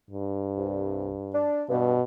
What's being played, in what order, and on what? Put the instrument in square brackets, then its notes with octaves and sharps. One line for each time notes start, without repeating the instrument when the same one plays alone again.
[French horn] G2
[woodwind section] C2
D4
[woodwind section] G2 [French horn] B2